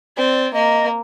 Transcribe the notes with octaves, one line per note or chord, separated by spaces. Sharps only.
C4 D5
A#3 D#5